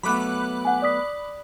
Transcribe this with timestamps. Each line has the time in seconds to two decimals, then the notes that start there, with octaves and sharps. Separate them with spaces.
0.03 F#3 A3 B3 B5 D6 F#6
0.65 F#5 G#5
0.82 D5 D#6 B6